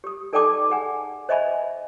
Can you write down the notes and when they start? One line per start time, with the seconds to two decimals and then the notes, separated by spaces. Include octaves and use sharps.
0.04 G4 D#6
0.33 D#4 A4 D5 G5 A5 D6
0.70 G#4 F#5 G#5
1.29 C5 D#5 E5 G#5 B5